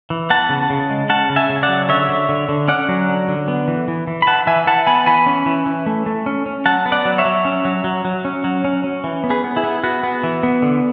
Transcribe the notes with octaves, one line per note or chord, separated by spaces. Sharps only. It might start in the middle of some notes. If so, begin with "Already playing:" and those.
E3
B3 F#5 A5
C#3
C#3
G#3
C#4 F#5 A5
C#3
E5 G#5
C#3
D5 F#5
F#3
D3 C#5 E5
D3
D3
D3
C#4 D5 F#5
F#3
D3
D3
B3
E3
E3
E3
B5
E3 F#5 A5
E3 E5 G#5
E3 F#5 A5
B3 G#5 B5
E3 G#5 B5
C#4
E3
E3
A3
A3
C#4
C#4
F#3 F#5 A5
B3
D5 F#5
F#3
C#5 E5
F#3
C#4
F#3
F#3
F#3
C#4
F#3
C#4
C#4
E3
B3
G#4 B4
B3
E4 G#4
B3
B3 F#4
B3
E3
B3
D3